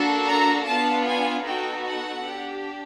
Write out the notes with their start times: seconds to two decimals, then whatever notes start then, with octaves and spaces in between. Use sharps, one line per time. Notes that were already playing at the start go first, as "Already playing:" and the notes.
Already playing: A#3 D4 F#4 A4
0.27 A#5
0.66 B3 D4 F4 A5
1.05 G#5
1.44 B3 D#4 F#4 A4 G5
1.84 F#5
2.23 D4 G4